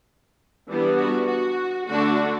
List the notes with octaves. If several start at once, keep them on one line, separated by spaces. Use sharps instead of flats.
E3 G3 B3 D4
F#4
F#4
D3 A3 D4 F#4